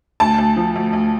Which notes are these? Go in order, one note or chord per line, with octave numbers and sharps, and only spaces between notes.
D2 A5
D2
F3
D2
D2